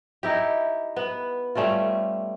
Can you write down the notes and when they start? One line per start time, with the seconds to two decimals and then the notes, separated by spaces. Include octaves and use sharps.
0.23 D#4 E4 G4
0.96 B3
1.55 G3 A3 C#4 F4